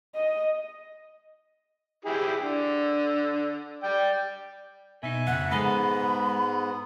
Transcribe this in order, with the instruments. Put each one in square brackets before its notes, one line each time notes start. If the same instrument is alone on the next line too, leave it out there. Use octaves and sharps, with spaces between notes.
[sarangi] D#5
[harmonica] E4 G4 G#4
D3
D5 G5
[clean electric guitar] B2 D#4 [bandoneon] E5 G#5
[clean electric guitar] F2 A#2 C#3 [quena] F#5
[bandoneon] G#2 B3 [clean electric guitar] G#3 G#4 A4 [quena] B5